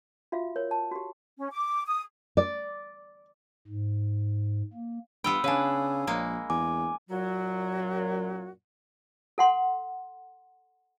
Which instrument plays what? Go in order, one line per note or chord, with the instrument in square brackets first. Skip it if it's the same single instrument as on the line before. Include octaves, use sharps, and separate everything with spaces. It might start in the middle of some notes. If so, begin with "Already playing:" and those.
[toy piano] F4 F#4 E5 F5
A#4 C#5
A5
F#4 G4
[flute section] C#4
D6
D#6
[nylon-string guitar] D5
[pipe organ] G#2
A#3
[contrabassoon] G2 [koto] B3 F4 G5 [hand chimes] B5 E6
[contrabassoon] C#3 [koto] D4 B4 [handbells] C#5 F5 G#5
[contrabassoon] A#1 [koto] G#3 A#3
[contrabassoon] E2 [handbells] G#5 [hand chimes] D6
[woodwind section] F#2 A#2 F#3 [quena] F#4
[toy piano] A4 F#5 C6